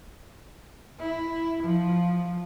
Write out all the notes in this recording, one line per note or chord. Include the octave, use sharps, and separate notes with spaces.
E4
F3